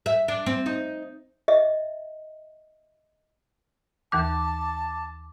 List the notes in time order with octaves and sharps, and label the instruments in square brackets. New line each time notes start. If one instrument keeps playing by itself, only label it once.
[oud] E5
D4
C4
D#4
[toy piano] D#5 E5
[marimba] D#2 E3 F#6 [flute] A5 [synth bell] D6